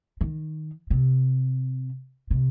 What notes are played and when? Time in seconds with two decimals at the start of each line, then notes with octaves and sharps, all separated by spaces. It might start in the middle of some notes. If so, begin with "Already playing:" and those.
0.21 D#3
0.90 C3
2.30 C3